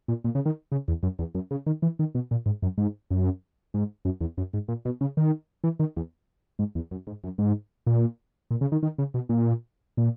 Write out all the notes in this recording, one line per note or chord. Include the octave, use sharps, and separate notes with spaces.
A#2
A#2
C#3
D#3
C#3
E2
F#2
E2
F#2
C#3
D#3
E3
D#3
B2
A#2
G#2
F#2
G#2
F#2
G#2
F#2
E2
F#2
G#2
A#2
B2
C#3
D#3
E3
D#3
E2
G#2
E2
F#2
G#2
F#2
G#2
A#2
A#2
C#3
D#3
D#3
C#3
B2
A#2
A#2